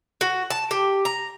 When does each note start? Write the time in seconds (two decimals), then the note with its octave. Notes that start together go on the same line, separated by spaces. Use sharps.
0.21 F#4
0.50 A5
0.71 G4
1.05 A#5